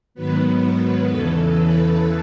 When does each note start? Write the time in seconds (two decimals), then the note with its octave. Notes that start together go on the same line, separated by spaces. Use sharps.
0.14 G#2 D#3 F#3 B3 B4
1.09 E2 C#3 E3 A4
1.58 B4